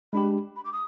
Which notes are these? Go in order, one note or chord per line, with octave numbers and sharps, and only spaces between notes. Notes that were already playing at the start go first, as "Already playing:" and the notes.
G#3 D4 G4 B5
B5
D6
D#6